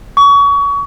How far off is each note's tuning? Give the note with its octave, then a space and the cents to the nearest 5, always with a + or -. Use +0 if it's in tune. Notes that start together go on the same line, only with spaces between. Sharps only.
C#6 +30